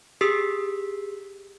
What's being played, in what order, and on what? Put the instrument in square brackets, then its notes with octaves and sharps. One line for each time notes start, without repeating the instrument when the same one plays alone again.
[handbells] G4 G#4 D#6 E6 B6 C7